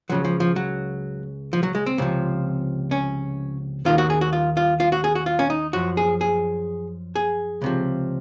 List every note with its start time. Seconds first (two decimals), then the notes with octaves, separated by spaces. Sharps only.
0.09 C#2 C#3 F3 F#3
0.25 F3
0.40 F3
0.56 F#3
1.53 F3
1.63 F#3
1.75 G#3
1.86 C4
1.98 C#2 C3 F3
2.91 C#4
3.85 D#2 D#3 F4
3.98 F#4
4.10 G#4
4.21 F#4
4.33 F4
4.57 F4
4.80 F4
4.92 F#4
5.04 G#4
5.15 F#4
5.26 F4
5.39 C#4
5.50 D#4
5.73 F#2 F3 F#4
5.97 G#4
6.21 G#4
7.16 G#4
7.61 C#2 C3 F3